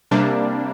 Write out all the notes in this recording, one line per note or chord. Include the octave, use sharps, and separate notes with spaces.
C3 G3 A#3 D4